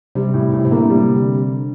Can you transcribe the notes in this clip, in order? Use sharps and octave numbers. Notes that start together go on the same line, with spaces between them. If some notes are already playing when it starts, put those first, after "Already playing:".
C3 G3
A2
A2
C3
D3 A#3
G3